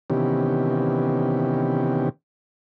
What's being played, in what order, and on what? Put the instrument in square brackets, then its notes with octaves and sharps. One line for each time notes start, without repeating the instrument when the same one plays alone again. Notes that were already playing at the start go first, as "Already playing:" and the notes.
[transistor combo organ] C3 D#3 E3 B3 C#4 G4